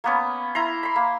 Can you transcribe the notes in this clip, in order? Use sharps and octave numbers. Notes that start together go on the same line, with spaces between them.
A#3 B3 C#4
E4 A#5 C6
B5 C6
A#3